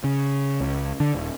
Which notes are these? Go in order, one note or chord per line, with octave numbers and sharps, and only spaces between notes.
C#3
C#2
D3
D#1